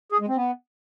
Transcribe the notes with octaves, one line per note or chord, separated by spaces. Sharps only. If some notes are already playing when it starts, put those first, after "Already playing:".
G#4
G#3
C4
B3